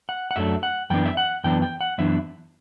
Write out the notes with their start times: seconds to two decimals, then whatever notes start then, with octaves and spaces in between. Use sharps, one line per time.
0.09 F#5
0.31 F#5
0.36 F#2 F#3 A3 D4 E5
0.63 F#5
0.90 F#2 E3 B3 D4 G5
1.06 E5
1.17 F#5
1.44 F#2 E3 B3 D4 G5
1.62 G5
1.81 F#5
1.98 F#2 E3 B3 D4 E5